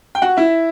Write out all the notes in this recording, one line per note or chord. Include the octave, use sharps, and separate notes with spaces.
G5
F#4 F#5
E4 E5